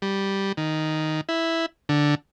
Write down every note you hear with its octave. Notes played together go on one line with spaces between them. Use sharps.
G3
D#3
E4
D3